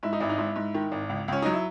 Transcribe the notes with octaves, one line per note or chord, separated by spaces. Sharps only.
G#2 E4
D#4
G#1 E4
D#4
G#2 E4
G#2
D#3
G#1
C#2
C#2 C#4
F#3 D#4
E4